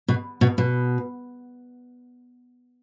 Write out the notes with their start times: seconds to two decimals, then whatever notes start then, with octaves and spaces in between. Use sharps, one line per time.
0.08 B2
0.41 B2
0.58 B2